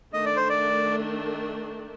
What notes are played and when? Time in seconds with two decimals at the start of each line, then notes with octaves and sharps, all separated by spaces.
0.13 D#3 A3 D4 D#5
0.26 D5
0.37 C5
0.50 D5